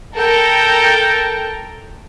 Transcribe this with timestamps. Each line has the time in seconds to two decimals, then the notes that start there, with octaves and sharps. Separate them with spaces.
0.16 A4 A#4 G5